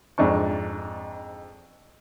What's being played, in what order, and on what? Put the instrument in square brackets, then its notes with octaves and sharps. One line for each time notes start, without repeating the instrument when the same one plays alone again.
[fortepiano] F2 G#2 D4 C#6